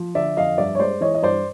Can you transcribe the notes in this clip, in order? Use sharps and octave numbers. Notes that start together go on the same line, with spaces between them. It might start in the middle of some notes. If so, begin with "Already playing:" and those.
Already playing: F3
D3 D5 E5
F2 D#5 F5
G2 D5 E5
C#5
G#3 C5 D5
E3 C#5 D#5
D#5
G2 C5 D5